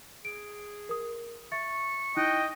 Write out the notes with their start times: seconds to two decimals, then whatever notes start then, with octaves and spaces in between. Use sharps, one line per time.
0.25 G#4 D7
0.89 A#4 D#6
1.52 E5 C#6 A6
2.17 D#4 E4 D#5 G5 F#6